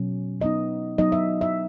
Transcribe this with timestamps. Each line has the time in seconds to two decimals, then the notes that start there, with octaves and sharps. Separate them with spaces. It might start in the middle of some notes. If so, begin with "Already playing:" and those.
Already playing: B2 F#3 C#4
0.41 F#3 B3 D#4 D#5
0.98 F#3 B3 D#4 D#5
1.12 E5
1.41 E5